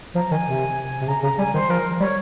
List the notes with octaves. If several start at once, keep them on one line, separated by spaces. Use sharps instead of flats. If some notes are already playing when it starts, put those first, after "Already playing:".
F3 A#5
D#3 G#5
C3
C3
C#3 A#5
C#3 A#5
G3 G#5
D#3 C5
F3 A#4
G3 C#5